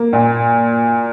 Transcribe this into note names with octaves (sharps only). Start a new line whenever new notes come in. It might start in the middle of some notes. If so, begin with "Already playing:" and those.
Already playing: A#3
A#2